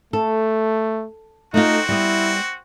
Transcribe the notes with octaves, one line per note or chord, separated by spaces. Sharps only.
A3 A4
A3 C4 D#4 F4 F#4
G3 B3 E4